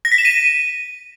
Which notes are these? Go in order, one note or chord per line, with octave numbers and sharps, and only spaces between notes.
A#6
B6
E7
D#7